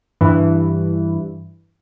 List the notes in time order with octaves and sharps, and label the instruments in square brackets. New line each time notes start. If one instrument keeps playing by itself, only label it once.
[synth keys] G2 E3